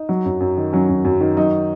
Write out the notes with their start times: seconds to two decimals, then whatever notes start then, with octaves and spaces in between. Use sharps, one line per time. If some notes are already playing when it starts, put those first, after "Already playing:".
Already playing: D#4
0.09 F#3
0.25 F#2
0.40 F#2
0.57 D#3
0.73 F#3 C#4
0.88 F#2
1.05 F#2
1.20 D#3
1.37 F#3 D#4